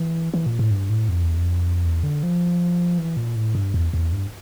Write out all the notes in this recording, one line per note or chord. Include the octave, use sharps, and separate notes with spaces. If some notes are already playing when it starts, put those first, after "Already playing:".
Already playing: E3
E3
A#2
A2
G2
A2
F2
E2
F2
E2
D3
F3
E3
A#2
A2
G2
E2
E2
G2